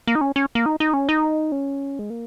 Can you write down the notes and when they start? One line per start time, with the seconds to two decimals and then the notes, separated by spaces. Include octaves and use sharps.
0.07 A#3
0.15 D#4
0.21 C#4
0.36 C#4
0.55 A#3
0.66 D#4
0.80 D#4
0.94 C#4
1.09 D#4
1.52 C#4
1.99 G#3
2.10 A#3